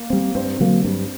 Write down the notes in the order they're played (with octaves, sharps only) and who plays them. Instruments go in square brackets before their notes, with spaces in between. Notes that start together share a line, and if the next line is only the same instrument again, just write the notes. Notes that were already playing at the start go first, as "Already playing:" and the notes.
Already playing: [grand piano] A#3
[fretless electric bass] G3 C4
[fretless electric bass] G2 [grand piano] C4
[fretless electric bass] D3 F#3 A#3
G2